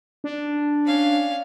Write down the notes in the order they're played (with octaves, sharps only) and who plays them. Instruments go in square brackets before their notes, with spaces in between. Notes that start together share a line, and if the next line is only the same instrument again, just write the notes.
[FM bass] D4
[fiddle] C#4 F5